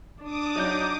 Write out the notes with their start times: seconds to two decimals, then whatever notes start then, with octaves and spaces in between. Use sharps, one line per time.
0.23 D4 D6 D#6
0.56 F#3 D#4 G6